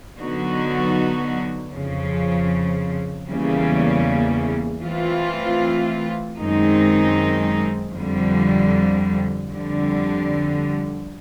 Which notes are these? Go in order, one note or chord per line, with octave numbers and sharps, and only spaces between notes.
D3 F#3 B3 D#4 F#4
F2 C#3 F3
E2 C#3 E3 G3 A#3
E3 A3 C4 F4
F#2 D#3 G#3 C4 D#4
F2 D3 G3
F2 D3 G3